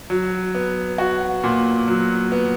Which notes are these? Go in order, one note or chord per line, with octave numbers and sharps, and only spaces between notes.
F#3
B3
F#4
A#2
F#3
B3